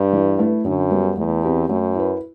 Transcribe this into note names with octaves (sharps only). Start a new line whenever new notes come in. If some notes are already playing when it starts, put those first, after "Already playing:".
Already playing: G2
E3
A3 E4 B4
F#2 D3
G3 B3
E2 A3
C4 G4 B4
F#2 A3
E4 B4